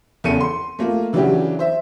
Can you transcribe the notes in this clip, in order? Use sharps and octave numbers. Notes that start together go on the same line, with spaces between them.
E2 C#3 A4 C#7 D#7
C6
A3 A#3 F4
C#3 E3 F#3 D4 F#4 G4
C5 E5